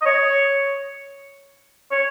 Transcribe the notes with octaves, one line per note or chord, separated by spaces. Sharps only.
D#5
C#5
C#5